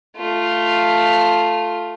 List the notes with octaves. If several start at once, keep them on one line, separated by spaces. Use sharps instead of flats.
A3 F4